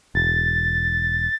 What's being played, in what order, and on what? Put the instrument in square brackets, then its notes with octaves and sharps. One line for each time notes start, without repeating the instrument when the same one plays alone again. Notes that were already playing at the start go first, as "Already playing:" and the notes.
[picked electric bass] E1 [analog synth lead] A6